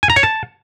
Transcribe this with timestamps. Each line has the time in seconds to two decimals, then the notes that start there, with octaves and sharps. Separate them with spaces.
0.03 G#5
0.10 A#5
0.16 C#5
0.23 A5